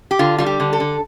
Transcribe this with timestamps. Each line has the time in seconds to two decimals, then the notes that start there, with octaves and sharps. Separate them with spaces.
0.11 G4
0.19 D3 F4
0.38 G3 F4
0.46 G4
0.60 D3
0.73 A4
0.80 D3